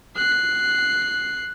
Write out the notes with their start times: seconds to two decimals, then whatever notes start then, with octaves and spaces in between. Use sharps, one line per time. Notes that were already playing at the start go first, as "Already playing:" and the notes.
0.16 F#6 C7